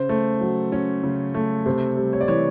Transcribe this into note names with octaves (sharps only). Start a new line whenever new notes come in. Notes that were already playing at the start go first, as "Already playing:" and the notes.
Already playing: C#3 C5
A3
F#3
C#4
C#3
A3
C3 C5
G3
C#5
D5
E3 C#5